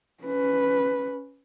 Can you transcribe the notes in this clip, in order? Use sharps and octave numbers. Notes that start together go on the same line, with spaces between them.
C#4 B4